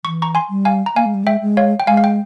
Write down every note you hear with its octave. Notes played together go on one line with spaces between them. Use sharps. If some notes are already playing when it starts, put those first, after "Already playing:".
E3 C#6
A#5 C#6
G#5 C6
G3
F5 G#5
A#5
A#3 F5 G#5
G#3
G3
G#3 E5 G5
G#3
C#5 F5
G5
G#3 F5 G#5
F5
G5